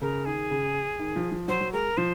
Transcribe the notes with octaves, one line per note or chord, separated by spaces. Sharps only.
C#3 A#4
D#3 G#4
C#3
D#3
F3
F3
F#3 C5
F#3
G#3 A#4
F3 C5